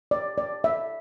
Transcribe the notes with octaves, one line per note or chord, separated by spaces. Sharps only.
D5
D5
E5